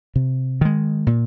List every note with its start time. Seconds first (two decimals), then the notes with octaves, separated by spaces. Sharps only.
0.16 C3
0.61 D#3 G#3
1.07 A#2